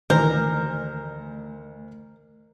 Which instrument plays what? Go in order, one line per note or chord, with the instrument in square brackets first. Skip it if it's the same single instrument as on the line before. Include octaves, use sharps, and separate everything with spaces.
[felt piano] D2 C5 G6 [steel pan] D#3 E3 [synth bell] A3 [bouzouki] A#4